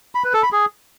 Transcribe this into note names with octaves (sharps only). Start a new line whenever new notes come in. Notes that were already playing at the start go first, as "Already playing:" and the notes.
B5
B4
A4
B5
G#4